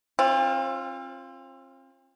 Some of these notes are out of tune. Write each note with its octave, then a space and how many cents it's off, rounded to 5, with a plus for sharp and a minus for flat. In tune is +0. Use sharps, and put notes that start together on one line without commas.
C4 +40 F4 +0